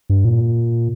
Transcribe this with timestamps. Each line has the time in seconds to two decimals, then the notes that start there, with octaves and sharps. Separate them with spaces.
0.10 G2
0.25 A#2